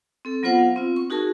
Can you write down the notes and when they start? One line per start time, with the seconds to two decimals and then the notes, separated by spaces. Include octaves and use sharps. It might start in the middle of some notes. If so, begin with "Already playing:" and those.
0.25 C4 A4
0.43 F#3 B3 F4 C5 F#5
0.58 F5
0.76 C4 F4
0.96 C#6
1.10 D#4 F#4 G#4 A#4 A5